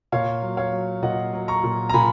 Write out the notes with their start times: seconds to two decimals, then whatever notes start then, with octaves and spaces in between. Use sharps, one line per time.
0.12 A#2 C#5 F5
0.42 F#3
0.57 C#5 F5
0.73 F#3
1.02 A#2 D#5 F#5
1.33 F#3
1.48 A#5 C#6
1.64 A#2
1.89 A#5
1.93 A#2 G#5 B5